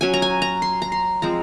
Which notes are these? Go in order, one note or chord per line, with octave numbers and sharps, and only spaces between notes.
F#3 C#4 G#5
A#5
G#5
A#5
C6
A#5
C6
F3 G#3 C4 A#5